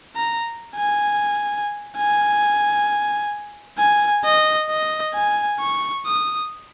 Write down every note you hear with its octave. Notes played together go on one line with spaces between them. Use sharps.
A#5
G#5
G#5
G#5
D#5
D#5
G#5
C#6
D#6